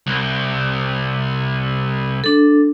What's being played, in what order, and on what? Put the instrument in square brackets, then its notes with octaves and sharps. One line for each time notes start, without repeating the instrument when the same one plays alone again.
[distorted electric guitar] C2
[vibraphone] D4 A4